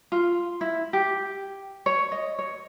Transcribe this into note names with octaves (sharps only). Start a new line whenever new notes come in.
F4
E4
G4
C#5
D#5
C#5